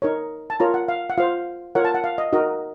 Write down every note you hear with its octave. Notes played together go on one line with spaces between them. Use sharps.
D#4 A#4 C#5
A5
F4 A#4 C#5 A#5
F#5
F5
F#5
F4 C5 F5
F4 A#4 C#5 F#5
A5
F#5
F5
D#5
D#4 F#4 A#4 D#5